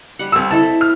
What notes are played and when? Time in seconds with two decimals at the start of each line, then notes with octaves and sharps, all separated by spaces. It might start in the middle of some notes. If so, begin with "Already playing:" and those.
0.19 G3 F#5
0.32 C2 E6
0.51 C4 E4 A4 A5
0.81 F6